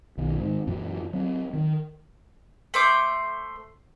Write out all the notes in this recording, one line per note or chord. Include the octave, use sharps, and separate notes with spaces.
B1 D#3
G#2 D#3
F#2 A#2 E3 F#3
F#3 C4
D#3
A3 C5 D6